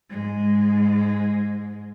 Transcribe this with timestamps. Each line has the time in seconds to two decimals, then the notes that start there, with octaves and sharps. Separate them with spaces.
0.10 G#2 G#3